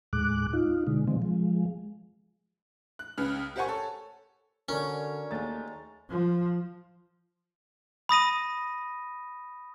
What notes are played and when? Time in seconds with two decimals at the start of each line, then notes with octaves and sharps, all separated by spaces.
0.13 D#2 A2 G#3 D6 F#6
0.53 D#4 F4
0.87 B2 D3 G#3
1.07 B2 D3 D#3 F3 G#3 C4
1.22 F3 G#3
2.99 F#6
3.18 C#2 C#3 B4 F6
3.56 G4 A#4 C5 F#5 G#5 C#6
3.68 A4 C#5
4.69 D3 C#4 F#4 A#4 C#5 D5
5.31 D#2 G#3 A3 A#5 A6
6.10 F3
8.09 B5 D#6 A#6 D#7